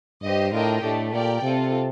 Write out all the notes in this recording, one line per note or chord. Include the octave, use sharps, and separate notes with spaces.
G2 G4 C5 D#5
A2 D4 F4 A#4 D#5 G5
A2 A3 D4 G4
A#2 G4 A#4 D5 G5
C3 C4 F4 A4